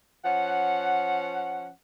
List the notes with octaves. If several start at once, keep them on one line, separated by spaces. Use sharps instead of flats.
F3 C#4 F#5